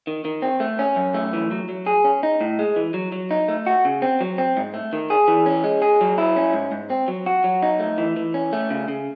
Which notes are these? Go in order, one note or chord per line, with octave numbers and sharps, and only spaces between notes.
D#3
D#3
C4
A3
C#4
F#2
A3
E3
F#3
F#3
G#4
C#4
D#4
A2
G#3
E3
F#3
F#3
D#4
A3
F#4
C#3
C4
F#3
C4
G#2
A3
D#3
G#4
E3
C#4
G#3
G#4
F#3
E4
C#4
G#2
G#2
C4
F#3
F#4
F#3
D#4
A3
E3
E3
C#4
A3
C#3
C#3